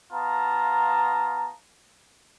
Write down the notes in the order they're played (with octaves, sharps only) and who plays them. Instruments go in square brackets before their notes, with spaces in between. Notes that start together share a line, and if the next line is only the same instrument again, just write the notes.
[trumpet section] B3 F4 A5 A#5